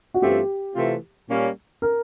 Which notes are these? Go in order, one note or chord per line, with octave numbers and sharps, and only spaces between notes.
F#4
G2 E3 A3 C4 F4 G4
C3 E3 A3 C4 F4
A#2 G3 A#3 C#4
A#4